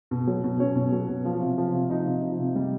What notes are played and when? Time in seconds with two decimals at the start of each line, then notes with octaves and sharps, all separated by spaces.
0.11 B2
0.27 F#3
0.44 B2
0.59 F#3 C#4 C#5
0.75 B2
0.92 F#3
1.08 B2
1.25 F3
1.41 C3
1.58 F3
1.74 C3
1.89 F3 D#4 D#5
2.06 C3
2.22 F3
2.39 C3
2.56 G3